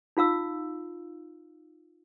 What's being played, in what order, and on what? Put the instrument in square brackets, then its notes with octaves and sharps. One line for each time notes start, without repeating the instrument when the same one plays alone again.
[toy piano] D#4 F4 F5 E6